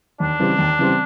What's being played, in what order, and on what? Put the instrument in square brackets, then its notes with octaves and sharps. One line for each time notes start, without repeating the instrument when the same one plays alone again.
[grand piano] D#2 [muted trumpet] D4
[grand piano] C#3 E3 G3 C4
D#2
C#3 E3 G3 C4